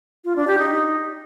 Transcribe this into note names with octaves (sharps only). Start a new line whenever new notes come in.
F4
D4
G4
D#4